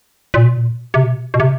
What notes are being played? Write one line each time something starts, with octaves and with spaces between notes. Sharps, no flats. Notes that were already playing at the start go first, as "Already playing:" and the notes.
A#2
B2
A#2
C3
B2
B2
C3